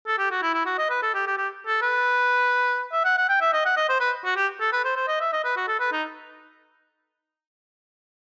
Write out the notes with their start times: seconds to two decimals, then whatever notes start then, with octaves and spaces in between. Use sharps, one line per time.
0.07 A4
0.18 G4
0.31 F#4
0.42 E4
0.54 E4
0.66 F#4
0.78 D#5
0.90 B4
1.03 A4
1.14 G4
1.27 G4
1.38 G4
1.67 A4
1.82 B4
2.93 E5
3.05 F#5
3.18 F#5
3.29 G5
3.41 E5
3.53 D#5
3.66 F#5
3.77 D#5
3.89 C5
4.00 B4
4.25 F#4
4.36 G4
4.61 A4
4.73 B4
4.85 C5
4.96 C5
5.08 D#5
5.21 E5
5.33 D#5
5.45 B4
5.57 F#4
5.68 A4
5.80 B4
5.92 D#4